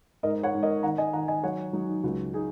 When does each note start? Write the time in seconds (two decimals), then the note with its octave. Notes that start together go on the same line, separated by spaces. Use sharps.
0.23 G#2 A#4 D#5
0.43 C#5 F#5
0.54 G#2
0.63 A#4 D#5
0.83 D#3 F#5 A#5
0.98 D#5 G#5
1.13 D#3 F#5 A#5
1.28 D#5 G#5
1.43 F#3 C#5 F#5
1.73 F#3 D#4
1.89 D#4
2.03 C#2 F#4
2.34 D#4 G#4